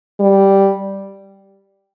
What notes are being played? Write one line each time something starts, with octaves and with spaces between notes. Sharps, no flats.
G3